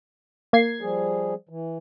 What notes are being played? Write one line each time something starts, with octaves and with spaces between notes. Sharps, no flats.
A#3 G#6 C7
F3 G3 G#4
E3